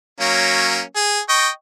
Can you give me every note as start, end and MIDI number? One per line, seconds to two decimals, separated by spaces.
0.20 0.81 54
0.20 0.81 58
0.20 0.81 61
0.96 1.20 68
1.29 1.49 75
1.29 1.49 79
1.29 1.49 85